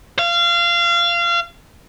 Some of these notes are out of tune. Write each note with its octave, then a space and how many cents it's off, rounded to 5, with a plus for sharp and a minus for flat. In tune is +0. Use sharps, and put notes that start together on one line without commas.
F5 -25